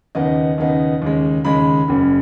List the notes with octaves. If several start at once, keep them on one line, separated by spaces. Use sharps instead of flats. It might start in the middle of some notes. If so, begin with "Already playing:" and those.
D#2 C#3 B3 D#4 D#5
D#2 C#3 B3 D#4
D#2 C#3 G#3
D#2 C#3 G#3 B5
F#1 F#2 C#3